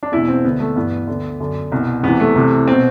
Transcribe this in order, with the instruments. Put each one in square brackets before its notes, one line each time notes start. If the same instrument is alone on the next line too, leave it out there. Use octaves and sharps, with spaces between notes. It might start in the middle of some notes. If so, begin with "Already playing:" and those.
[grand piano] D4
E2 B2 E4
C4
D2 D3 B3
A3
G2 E3 B3
D2 D3
F#2 D3
C2 B2
E2 C3 E3 B3
A3
C2 C3 E3
B2 C4